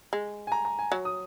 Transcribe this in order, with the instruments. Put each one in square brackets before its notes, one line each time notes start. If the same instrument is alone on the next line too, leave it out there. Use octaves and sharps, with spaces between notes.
[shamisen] G#3
[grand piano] G#5
A#5
A#5
G#5
[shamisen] F#3
[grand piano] D#6